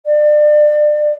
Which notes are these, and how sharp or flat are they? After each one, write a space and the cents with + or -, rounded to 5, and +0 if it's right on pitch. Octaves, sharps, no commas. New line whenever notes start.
D5 +30